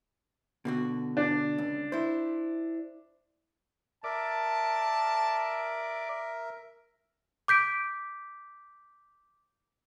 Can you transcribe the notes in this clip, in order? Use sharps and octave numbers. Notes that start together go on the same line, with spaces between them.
B2 D3 F#4
D4
C#2
E4 C5
A#4 D5 E5 A5
D6 G6 B6 D7